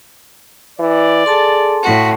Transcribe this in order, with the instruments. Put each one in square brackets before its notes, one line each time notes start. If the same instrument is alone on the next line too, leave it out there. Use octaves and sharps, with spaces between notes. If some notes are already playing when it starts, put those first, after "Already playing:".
[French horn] E3 [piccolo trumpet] D5
[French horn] G#4 [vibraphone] A4 A5 C6
[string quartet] A2 F#4